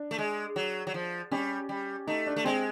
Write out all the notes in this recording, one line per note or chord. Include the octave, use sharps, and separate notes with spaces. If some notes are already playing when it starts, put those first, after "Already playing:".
Already playing: D4
A3
G#3
F#3
F#3
F3
G3 C#4
G3
A3 D#4
D4
A3
G#3 C4